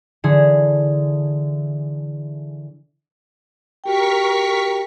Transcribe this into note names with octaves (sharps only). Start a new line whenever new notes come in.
D3 E3 G#4
F#4 G4 A#4 G5 C#6 B6